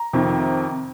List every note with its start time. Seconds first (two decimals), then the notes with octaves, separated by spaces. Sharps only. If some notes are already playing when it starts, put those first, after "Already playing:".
Already playing: A#5
0.13 F2 C3 D#3